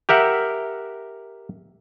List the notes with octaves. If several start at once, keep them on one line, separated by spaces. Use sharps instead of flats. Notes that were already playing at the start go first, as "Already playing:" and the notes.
G4 A#4 E5 F#5